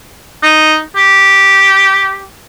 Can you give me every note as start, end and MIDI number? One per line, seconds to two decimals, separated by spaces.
0.43 0.78 63
0.96 2.25 67